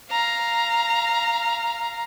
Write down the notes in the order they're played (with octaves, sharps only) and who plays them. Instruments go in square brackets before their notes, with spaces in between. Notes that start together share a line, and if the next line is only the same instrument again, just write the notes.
[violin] F5 A#5